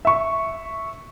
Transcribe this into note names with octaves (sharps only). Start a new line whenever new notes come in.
E5 C#6